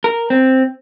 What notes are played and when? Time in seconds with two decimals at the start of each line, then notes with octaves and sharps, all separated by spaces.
0.04 A#4
0.30 C4